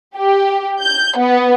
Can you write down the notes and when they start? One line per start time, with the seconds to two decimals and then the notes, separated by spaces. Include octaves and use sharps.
0.16 G4
0.81 G6
1.17 B3